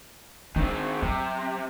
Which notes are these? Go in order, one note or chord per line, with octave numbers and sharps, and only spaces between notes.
D#3 C4 D4
C3 F#3